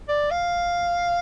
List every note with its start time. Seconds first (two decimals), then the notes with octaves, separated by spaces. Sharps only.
0.08 D5
0.31 F5